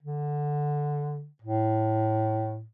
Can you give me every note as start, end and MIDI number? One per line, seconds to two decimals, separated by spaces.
0.03 1.26 50
1.42 2.64 45